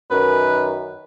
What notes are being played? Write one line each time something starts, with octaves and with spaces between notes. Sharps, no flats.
F#2 D#3 B4